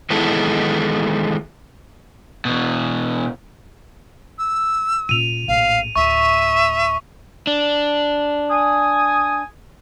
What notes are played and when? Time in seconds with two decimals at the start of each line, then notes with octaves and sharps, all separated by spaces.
0.10 D#3 E3 G#3 B3 E4 A4
2.45 B2 E3
4.38 E6
5.09 A#2 C#4 D#7 F7
5.48 A#1 A2 F5
5.96 D2 A2 E5 C#6
7.47 D4
8.50 G#5 D#6